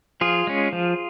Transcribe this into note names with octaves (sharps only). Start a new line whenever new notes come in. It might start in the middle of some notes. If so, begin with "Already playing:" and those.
F3 F4 G#4
G#3 C#4
F3